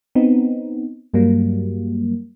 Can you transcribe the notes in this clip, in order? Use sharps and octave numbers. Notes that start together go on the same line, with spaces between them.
B3 C4 D#4
G2 F#3 G3 A#3